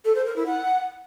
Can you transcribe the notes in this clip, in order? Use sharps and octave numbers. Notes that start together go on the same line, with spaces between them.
A4
C5
A#4
E4
F#5